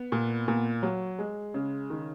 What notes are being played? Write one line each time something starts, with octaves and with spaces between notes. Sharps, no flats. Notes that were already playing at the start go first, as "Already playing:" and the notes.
Already playing: B3
A#2
A#2
F#3
G#3
C#3
D#3